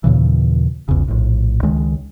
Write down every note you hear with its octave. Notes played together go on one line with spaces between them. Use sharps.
D#2 A#2 C#3 E3
A#1 E2 C#3
A#1 A2
C#2 D#3 G#3